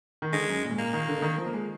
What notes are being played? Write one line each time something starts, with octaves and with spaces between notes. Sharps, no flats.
D#3
D3 G#3
F#2
A#2
G#2
A#2 A#3
D#3
D3
D3
D#3
F3
A#3
G#3